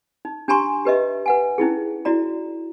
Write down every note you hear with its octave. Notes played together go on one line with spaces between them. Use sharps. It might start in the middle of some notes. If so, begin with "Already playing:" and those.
D#4
D4 G4 G#5 A#5 C6 C#6
G4 B4 D#5 E5
B4 F#5 G#5
C#4 D#4 E4 G#4
E4 F#4 D5 A#5